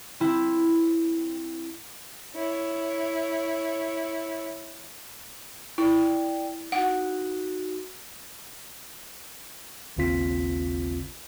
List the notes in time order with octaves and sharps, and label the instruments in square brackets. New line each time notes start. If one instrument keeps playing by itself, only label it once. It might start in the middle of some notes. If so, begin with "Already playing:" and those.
[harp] C4 E4
[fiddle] E4 C#5
[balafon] E4 [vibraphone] D5 G5
[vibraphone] D#4 F#4 [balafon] F#5
[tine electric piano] A1 D#2 C#3 C4 F4 B6